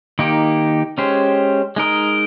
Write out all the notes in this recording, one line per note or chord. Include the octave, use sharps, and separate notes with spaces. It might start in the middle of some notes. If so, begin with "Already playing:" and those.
D#3 A#3 D#4 G4
G#3 C#4 G4 C5
G#3 D#4 A#4 D#5